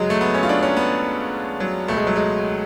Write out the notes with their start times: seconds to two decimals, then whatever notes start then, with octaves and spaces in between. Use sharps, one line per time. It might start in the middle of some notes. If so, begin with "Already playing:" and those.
Already playing: F#2 C#3 F#3 G#3
0.10 A3
0.21 B3
0.34 C#4
0.43 F4
0.49 D4
0.63 C#4
0.77 B3
1.60 F#3
1.88 C#2 B2 A3
1.97 G#3
2.07 F#3
2.16 G#3